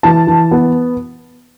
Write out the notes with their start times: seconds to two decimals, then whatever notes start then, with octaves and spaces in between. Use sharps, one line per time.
0.03 E3 A5
0.27 E3
0.51 B3